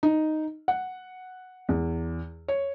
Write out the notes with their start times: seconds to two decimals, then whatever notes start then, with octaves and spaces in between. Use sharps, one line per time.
0.03 D#4
0.68 F#5
1.69 E2
2.48 C#5